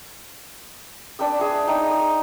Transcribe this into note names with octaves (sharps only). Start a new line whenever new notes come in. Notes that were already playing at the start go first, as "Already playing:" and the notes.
D4 B4 G5 E6
G#4 E5
D#4 G5
D#6